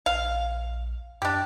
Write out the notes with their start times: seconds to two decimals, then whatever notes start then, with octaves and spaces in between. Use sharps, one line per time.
0.06 A#1 F5
1.22 F#2 D4 G4